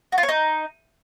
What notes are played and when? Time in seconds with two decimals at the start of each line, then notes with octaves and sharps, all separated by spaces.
0.12 F#4
0.18 F4
0.23 C#5
0.29 D#4